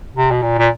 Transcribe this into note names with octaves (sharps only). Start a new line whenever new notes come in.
C3
B2
A#2
A#2